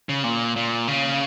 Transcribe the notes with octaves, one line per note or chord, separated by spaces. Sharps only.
C#3
A#2
A#2
C#3